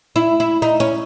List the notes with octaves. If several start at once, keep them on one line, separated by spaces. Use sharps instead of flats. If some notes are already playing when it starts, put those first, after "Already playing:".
E4
E4
D#4
C#4